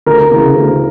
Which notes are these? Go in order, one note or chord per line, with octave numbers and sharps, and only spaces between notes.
D2 A#4
C#3 E3
D2